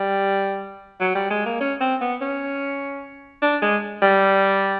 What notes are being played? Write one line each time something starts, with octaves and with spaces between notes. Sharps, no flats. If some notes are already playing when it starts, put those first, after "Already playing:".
Already playing: G3
F#3
G3
G#3
A#3
C#4
C4
B3
C#4
D4
G#3
G3